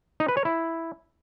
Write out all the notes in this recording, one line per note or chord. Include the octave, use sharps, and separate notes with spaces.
D#4
B4
C#5
E4